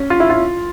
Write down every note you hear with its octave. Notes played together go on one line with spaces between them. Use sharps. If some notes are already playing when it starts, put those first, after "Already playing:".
Already playing: C#4
F4
E4
F4